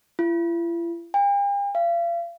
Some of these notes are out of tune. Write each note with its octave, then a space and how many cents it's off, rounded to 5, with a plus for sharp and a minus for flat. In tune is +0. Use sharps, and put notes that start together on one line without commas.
E4 +45
G5 +45
F5 -35